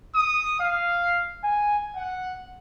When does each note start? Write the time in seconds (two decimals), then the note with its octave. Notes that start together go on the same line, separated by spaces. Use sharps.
0.15 D#6
0.60 F5
1.44 G#5
1.97 F#5